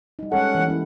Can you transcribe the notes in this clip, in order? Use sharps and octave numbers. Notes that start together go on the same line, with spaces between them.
G3 D#4
G3 G#3 C#4 A4 F#5
E3 A#3
C#4 E4 B4